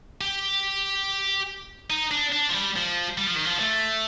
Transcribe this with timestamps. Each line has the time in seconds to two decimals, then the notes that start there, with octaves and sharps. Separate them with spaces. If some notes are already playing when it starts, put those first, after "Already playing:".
0.21 G4
1.90 D#4
2.11 D4
2.32 D4
2.49 F3
2.53 G3
2.76 F3
3.18 G3
3.27 F3
3.36 D#3
3.46 F3
3.60 A3